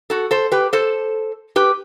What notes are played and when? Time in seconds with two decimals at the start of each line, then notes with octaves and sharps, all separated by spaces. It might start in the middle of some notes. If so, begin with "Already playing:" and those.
0.10 F#4 A4
0.31 A4 C5
0.52 G4 B4
0.73 A4 C5
1.56 G4 B4